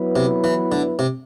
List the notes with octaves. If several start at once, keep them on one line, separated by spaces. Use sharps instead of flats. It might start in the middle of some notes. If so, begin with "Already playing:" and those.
Already playing: F#3 B3 E4 B4
C3
E3
D3
C3